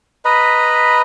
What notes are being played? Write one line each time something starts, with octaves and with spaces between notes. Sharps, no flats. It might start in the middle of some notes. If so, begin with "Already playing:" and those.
B4 D#5 A#5 B5